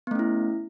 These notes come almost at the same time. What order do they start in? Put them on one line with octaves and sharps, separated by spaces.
B3 A3 C#4 E4